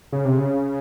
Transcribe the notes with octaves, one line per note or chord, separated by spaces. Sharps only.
C#3
C3
C#3